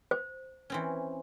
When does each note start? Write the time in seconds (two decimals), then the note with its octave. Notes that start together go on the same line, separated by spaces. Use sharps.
0.11 C5
0.70 E3 C4 C#4